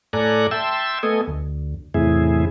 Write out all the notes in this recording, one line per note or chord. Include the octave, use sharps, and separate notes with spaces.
A2 A4 D5 G#5 A#5 F#6
E5 G5 A5 C6 E6
A3 B3 A4 D#5 G#5
D2
E2 A2 C3 E4 G#4